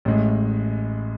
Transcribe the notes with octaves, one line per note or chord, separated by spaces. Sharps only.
A1 A2 G#3